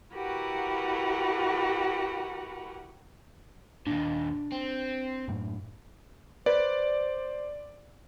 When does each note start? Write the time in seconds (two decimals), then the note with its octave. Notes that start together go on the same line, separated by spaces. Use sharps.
0.13 E4 F#4 G4 A#4 B4 F#5
3.87 D#2 A#2 D4
4.52 C4
5.28 F#2 A2
6.46 B4 C5 D5